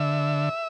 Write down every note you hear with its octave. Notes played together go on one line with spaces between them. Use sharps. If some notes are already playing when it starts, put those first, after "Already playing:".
Already playing: D3 E5